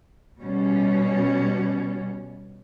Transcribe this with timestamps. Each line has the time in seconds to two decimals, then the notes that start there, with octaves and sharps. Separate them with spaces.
0.39 B2 G3 C#4